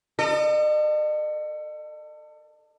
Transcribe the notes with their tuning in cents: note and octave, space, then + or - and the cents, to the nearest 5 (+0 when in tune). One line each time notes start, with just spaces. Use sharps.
A4 +30 D#5 -45